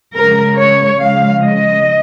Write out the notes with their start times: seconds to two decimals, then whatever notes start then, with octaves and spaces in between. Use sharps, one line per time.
0.16 C#3 G#3 A#4
0.58 C#5
1.01 C#3 F3 G#3 F5
1.43 D#5